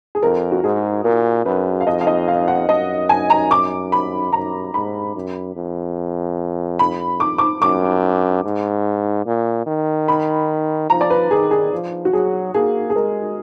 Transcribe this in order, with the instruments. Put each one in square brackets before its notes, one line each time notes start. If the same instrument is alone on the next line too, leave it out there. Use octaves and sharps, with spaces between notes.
[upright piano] G#4
[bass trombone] F2 [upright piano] A#4
[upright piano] F#4
[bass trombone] G#2 [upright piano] G#4
[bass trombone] A#2 [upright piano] A#4
[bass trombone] F#2 [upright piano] B4
[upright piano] F5
[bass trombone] F2 [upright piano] D#5
[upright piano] F5
D#5
F5
F#5
[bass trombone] F#2 [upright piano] D#5
[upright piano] G#5
A#5
D6
B5
[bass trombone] F#2 [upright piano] A#5
[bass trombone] G#2 [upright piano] B5
[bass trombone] F#2
F2
[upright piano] B5
D6
D6
[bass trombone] F#2 [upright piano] D6
[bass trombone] G#2
A#2
D#3
[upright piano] B5
[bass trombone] F3 [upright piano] A#5
[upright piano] D5
B4
[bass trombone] D#3 [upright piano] G#4
[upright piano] G#4
[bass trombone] F3
[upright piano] F#4
[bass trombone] F#3 [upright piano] G#4
[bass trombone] A#3 [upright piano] G#4
[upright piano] G#4
[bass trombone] G#3 [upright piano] A#4